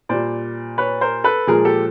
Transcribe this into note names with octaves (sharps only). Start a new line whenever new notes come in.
A#2 G3 C5 D5
B4 C#5
A#4 C5
A4 B4
A#2 F3 G#3 G#4 A#4
G4 A4